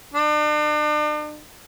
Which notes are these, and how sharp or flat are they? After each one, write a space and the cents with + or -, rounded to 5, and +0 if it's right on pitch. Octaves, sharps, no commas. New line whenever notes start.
D4 +40